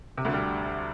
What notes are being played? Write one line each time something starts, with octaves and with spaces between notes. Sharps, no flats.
C3
D2 D3
G3